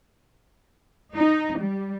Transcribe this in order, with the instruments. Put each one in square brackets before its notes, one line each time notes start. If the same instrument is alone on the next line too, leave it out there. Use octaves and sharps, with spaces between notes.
[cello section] D#4
G3